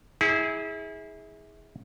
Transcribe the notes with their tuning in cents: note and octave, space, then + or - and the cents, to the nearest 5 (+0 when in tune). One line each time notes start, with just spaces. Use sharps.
E4 -30 G#4 +0